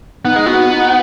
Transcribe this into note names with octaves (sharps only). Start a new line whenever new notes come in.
B3 D#4
G#3
B3 F#4
D#4